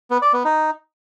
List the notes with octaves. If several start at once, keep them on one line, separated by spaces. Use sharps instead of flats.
B3
D5
B3
D#4